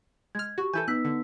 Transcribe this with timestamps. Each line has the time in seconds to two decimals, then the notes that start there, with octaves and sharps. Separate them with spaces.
0.35 G#3 F6 G#6
0.58 F#4 G4 C#6
0.74 E3 E4 A4 G#5 G6
0.88 B3 D#4 E6 F#6 B6
1.05 D3